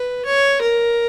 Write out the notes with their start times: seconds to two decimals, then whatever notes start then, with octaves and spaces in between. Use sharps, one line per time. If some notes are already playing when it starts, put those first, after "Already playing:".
Already playing: B4
0.25 C#5
0.61 A#4